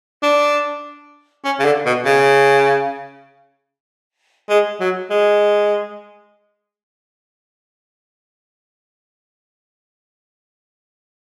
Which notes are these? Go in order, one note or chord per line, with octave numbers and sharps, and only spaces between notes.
D4
C#4
C#3
D3
B2
C#3
G#3
F#3
G#3